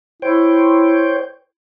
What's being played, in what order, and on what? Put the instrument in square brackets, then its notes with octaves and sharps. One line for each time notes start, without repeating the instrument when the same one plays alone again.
[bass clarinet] E4 [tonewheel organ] C5 C#5 G5